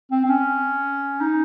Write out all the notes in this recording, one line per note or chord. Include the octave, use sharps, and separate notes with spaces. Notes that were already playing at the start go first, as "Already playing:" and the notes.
C4
C4
C#4
D#4